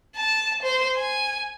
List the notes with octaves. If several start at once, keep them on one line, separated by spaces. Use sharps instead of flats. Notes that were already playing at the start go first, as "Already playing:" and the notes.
A5
C5
G#5